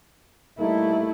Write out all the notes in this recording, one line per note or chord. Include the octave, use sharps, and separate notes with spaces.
G3 A3 A#3 D#4 E4